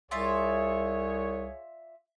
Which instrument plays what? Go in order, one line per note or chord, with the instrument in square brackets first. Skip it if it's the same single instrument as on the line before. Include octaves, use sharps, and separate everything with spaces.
[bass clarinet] C2 [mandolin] F4 D5 E5 [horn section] G#4 C#5